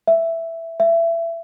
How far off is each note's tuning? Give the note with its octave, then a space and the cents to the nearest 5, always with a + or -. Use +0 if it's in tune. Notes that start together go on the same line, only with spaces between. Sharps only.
E5 +5
E5 +25